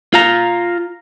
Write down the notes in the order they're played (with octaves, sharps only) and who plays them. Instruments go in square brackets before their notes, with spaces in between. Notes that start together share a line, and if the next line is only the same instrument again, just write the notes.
[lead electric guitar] F4 A#5